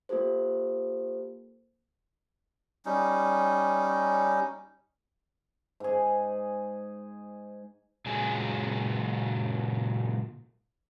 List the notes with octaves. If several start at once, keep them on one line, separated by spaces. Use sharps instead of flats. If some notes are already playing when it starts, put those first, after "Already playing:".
A#3 F4 G4 A4 C5
G3 C#4 D#4
G#2 G#4
A#2 C#3 F#3 G#3 G#4 G#5